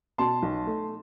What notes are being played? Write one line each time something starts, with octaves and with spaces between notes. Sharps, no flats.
B2 A5 C6
B1
A3